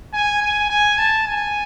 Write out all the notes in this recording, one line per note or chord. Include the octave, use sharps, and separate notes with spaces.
G#5
G#5
G#5
A5
G#5